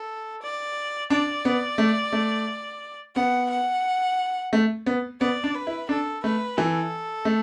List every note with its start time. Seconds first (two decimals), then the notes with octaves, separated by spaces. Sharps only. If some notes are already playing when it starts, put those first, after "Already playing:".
Already playing: A4
0.42 D5
1.10 D4 D5
1.45 B3
1.78 A3
2.13 A3
3.15 B3 F#5
3.50 F#5
4.53 A3
4.86 B3
5.21 B3 D5
5.44 D4
5.55 B4
5.67 E4
5.89 D4 A4
6.23 A3 B4
6.57 E3 A4
7.25 A3